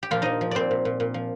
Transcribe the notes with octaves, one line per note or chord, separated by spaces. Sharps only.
G4
A#2 F3 F4
F3 D#4 D#5
F3
A#2 C4 C5 D5
A#2
A#2
A#2
F3